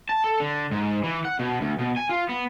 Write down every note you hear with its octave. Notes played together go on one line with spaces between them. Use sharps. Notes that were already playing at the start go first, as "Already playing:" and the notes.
A5
A4
D3
G#2
E3
F#5
B2
D2
B2
G#5
F4
B3